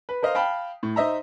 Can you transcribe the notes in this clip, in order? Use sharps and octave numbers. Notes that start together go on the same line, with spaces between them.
B4
A#4 C5 D#5 F5
F5 G5 A5 B5
A2
D#4 C5 D#5 E5 A#5